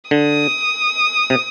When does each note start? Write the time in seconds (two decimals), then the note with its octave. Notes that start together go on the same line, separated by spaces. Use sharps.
0.11 D3 D#6
1.30 C3